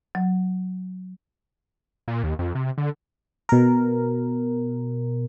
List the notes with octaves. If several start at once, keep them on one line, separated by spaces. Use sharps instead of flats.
F#3
A#2
D#2
F2
C3
D3
B2 A#4